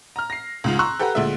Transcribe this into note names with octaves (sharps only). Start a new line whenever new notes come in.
A#5 F6
A#6 C7
C#2 G#2 F4
A#5 C6 C#6 E6 F#6
G4 A4 B4 F#5 A#5
D2 A#2 G#3 E5